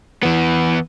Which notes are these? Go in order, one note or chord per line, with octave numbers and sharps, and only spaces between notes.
E3 B3